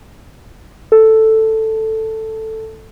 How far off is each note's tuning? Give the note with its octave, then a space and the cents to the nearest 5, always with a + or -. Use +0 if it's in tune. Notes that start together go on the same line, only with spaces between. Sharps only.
A4 +5